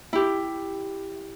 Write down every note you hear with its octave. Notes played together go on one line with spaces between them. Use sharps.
E4 G4